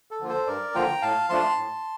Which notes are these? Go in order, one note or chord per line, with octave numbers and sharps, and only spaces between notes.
A4
D3 F3 A#3 F4
A4 C5
G2 A#4 D5
D3 F3 A#3 F4 G5 A#5
A2 F5 A5
F3 A3 D4 F4 A5 C6
A2